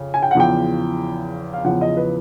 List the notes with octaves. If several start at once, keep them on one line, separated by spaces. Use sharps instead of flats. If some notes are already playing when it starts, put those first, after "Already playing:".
Already playing: F2 C#3
G#5
G5
F#5
E2 C#3 F3 G5
F5
E2 C#3 F3 F#5
D#5
B4